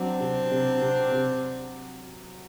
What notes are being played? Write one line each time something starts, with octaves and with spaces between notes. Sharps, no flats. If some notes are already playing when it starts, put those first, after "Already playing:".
Already playing: F#3 C4 D4
C3
C3
C3
C3